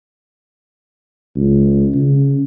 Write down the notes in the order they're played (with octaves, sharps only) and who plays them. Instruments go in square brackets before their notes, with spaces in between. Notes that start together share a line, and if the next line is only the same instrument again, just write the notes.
[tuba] C#2
C#3